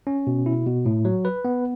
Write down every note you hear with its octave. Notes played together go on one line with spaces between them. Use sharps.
C#4
B2
E4
B2
A2
F#3
B4
B3